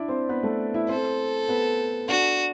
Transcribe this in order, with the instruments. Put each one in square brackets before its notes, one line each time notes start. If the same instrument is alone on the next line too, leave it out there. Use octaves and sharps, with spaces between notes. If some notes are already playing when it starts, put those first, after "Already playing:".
Already playing: [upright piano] D4 E4 D5 E5
C4 C5
B3 B4
A3 A4
E4 E5
[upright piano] C4 C5 [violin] A4
[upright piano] B3 B4
[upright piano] D4 D5 [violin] F#4